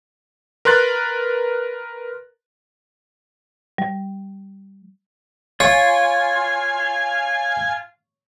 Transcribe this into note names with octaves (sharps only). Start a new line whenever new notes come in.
A#4 B4 C6 F#6 A6
G3
F4 C#5 G#5